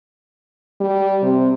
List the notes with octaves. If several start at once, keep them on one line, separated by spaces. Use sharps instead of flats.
G3
C3